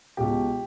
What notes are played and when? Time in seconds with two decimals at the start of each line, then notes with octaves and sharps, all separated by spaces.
0.17 C#2 B2 G4